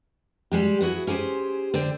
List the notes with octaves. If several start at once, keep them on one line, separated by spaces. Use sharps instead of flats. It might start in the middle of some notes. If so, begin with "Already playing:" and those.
G3 G#3 G4
B3 E4 F#4 G#4
C#4 G4 G#4 B4 C5
D3 C5 D5 G5